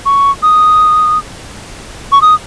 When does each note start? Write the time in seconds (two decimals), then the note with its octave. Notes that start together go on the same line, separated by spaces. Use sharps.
0.06 C#6
0.42 D#6
2.12 C#6
2.22 D#6